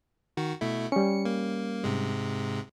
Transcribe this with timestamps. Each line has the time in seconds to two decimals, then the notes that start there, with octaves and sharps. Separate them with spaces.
0.37 D#3 F#4
0.61 B2 A3 E4
0.92 G3 C#4 C#7
1.25 A#3
1.84 G#2 C3 G#3